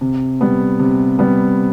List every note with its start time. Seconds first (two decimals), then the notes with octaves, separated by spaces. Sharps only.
0.01 C3
0.41 G3 B3
0.80 C3
1.19 G3 B3